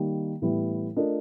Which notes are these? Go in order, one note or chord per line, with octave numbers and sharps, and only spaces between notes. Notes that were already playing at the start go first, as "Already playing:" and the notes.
Already playing: D#3 G3 A#3
A2 E3 G3 B3 E4
A3 D4 F4 A#4 D#5